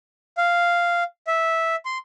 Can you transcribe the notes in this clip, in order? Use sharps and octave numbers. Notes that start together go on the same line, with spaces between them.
F5
E5
C6